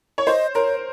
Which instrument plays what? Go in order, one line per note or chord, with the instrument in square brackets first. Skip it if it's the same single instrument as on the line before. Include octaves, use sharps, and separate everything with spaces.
[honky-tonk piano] C#5
[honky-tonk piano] C5 [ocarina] D#5
[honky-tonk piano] A#4 [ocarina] C#5